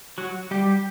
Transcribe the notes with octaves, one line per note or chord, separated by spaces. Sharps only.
F#3 F#4
G3 G4